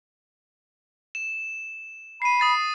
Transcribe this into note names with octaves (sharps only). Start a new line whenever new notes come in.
E7
B5 C7 D#7
D#6 A6 C7